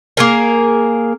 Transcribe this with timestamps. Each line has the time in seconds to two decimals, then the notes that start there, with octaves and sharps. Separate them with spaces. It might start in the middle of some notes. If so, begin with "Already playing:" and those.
0.17 A#3 G#4 A#4